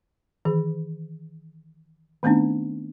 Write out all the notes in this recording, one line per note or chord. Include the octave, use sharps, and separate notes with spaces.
D#3 E3 G#4
D#3 A3 B3 C4 D4 D#4